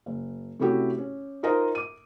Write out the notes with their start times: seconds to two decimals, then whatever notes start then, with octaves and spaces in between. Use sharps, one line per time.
0.06 F#1
0.60 C3 A3 C#4 E4 F#4 G4
0.98 C#4
1.43 D#4 F4 A#4 C5 D#5 A#5
1.75 D6 D#7